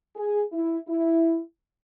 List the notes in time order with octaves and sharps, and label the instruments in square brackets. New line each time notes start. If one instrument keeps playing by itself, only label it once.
[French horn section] G#4
E4
E4